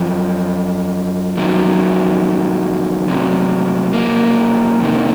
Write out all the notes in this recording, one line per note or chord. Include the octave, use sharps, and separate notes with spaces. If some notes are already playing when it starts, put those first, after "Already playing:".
Already playing: F#2 F3
F2 D#3 F#3
F2 C3 F#3
A#3
F2 C3 D#3